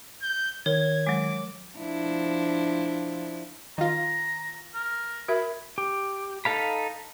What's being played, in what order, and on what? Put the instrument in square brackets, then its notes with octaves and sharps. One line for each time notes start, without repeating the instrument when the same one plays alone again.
[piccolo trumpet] G6
[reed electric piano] D#3 [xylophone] A#4 C#5 [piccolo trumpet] G#6
[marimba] F#3 G#3 [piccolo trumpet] D6
[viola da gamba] F3 D4 E4
[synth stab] D#3 F4 [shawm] A#5
[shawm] A#4
[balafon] F#4 A#4 E5 [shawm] B5
[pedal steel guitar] G4
D#4 A4 F5 B5